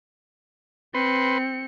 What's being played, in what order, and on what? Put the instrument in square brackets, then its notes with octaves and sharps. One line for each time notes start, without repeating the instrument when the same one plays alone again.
[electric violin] C4 C#7 [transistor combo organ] B4 C6